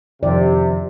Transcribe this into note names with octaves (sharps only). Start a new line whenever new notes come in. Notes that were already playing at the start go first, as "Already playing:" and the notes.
F2 C3 D#3 F3 D5